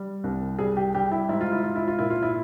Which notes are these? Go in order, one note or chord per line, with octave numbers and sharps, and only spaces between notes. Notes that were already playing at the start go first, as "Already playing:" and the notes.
Already playing: G3
C2
G3 G#4
G4
G3 G4
E4
G#2 E4
F4
E4
G#2 F4
E4
F4
A#2 E4
F4
E4